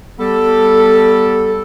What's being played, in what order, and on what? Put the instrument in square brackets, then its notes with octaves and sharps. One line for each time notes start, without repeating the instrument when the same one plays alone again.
[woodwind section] G3 B3 G4 A4